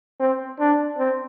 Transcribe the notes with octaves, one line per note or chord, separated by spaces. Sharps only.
C4
D4
C4